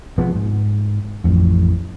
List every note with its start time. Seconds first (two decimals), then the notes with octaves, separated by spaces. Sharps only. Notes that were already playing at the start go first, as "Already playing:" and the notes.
0.18 C3 F3 G#3 B3
0.35 G#2
1.24 A1 F2